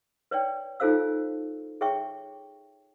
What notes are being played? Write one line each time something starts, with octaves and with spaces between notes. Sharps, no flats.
B4 C#5 D5 G5
D#4 F4 A4 C5 F5 E6
G#4 C#5 E5 G5 C#6